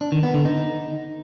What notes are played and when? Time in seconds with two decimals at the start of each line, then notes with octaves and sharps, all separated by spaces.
0.01 D4
0.12 D#3
0.23 B3
0.34 D3
0.45 D#4